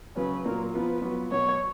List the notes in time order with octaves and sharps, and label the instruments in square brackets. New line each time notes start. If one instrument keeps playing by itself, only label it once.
[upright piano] C#3 F#3 C#4 [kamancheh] B4
[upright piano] A#2 F#3 A#3 F4 [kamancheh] A#4
[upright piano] F3 B3 F4 [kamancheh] B4
[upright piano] F#3 B3 F4
[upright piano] B2 F#3 B3 [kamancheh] C#5